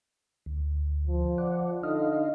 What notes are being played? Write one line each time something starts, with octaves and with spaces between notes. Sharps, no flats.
D2
F3
D5 F#5
D3 D#4 D#5 F5